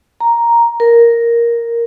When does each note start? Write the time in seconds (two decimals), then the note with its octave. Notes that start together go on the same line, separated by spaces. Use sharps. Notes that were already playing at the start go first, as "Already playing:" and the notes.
0.21 A#5
0.80 A#4